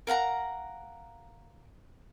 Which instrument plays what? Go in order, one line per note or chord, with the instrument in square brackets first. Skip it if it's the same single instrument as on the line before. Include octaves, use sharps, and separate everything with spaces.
[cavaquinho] A#4 F5 F#5 A#5